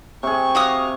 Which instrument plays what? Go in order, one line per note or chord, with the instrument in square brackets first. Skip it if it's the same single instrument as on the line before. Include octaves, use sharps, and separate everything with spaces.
[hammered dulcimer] C3 G#4 [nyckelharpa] C#6
[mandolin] F#4 F5 D#6 [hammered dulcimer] D6